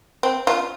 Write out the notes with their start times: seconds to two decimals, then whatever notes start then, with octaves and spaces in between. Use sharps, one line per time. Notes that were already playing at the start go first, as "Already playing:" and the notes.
0.23 C4
0.47 F4